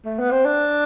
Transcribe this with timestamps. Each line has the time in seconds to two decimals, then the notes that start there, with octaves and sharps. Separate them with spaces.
0.05 A3
0.19 B3
0.31 C4
0.45 D4